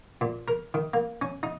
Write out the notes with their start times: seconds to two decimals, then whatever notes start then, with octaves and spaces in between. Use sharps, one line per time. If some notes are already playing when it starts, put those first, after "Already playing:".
0.21 A#2
0.48 A#4
0.74 D#3
0.94 A#3
1.22 C#4
1.43 D#4